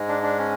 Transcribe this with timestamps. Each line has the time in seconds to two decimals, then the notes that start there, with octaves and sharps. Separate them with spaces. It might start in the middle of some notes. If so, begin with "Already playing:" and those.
Already playing: G#2 G#3
0.09 D4
0.23 D4
0.38 C#4